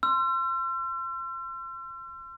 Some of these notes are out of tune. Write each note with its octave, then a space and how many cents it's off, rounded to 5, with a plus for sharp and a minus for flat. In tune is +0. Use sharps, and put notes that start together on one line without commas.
C6 +0 E6 +45